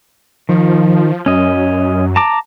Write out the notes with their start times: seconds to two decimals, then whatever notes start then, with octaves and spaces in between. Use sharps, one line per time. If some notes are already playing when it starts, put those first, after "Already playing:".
0.49 D#3 F3
1.26 F#2 C#4 D#5
2.16 A5 A#5 D6